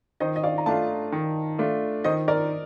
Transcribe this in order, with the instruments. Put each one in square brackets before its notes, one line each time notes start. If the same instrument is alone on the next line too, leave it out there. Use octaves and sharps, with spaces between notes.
[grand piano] D#3 [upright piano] C5 D#5
[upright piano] D#5
D5 F5
A#5
[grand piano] A3 D4 F4 [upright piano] F5 A5
[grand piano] D#3
A3 D4 F4
[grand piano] D#3 [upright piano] C5 D#5
[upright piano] A#4 D5